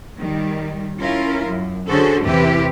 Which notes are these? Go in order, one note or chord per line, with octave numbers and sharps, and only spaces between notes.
D#3 G3
C#4 E4 F4 A#4
F#2
D3 C#4 F#4 G#4 A4 C5
E2 C3 E3 E4 G4 B4